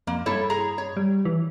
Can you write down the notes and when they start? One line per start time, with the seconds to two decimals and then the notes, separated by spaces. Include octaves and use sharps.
0.07 F2 A#3
0.26 G2 E4 A4 C#5
0.50 G#4 A#5
0.78 C#5
0.97 G3
1.25 E3